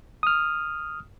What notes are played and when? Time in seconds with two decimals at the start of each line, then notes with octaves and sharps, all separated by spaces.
0.23 D#6 F6